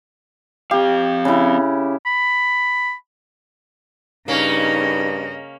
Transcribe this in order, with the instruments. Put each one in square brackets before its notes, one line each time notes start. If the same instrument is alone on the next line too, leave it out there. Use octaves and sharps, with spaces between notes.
[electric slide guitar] C4 F5 [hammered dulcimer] G4
[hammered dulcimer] C#3 E4
[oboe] B5
[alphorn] G2 [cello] C#3 D#5 [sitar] A#3 C#4 [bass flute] D#4